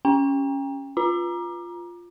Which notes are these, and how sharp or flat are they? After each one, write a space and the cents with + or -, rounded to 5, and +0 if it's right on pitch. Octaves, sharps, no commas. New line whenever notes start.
C#4 +0 G5 +30
F4 +0 A#5 +25